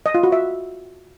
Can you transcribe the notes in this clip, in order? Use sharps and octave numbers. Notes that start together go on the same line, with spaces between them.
D#5
F4
F#4
E5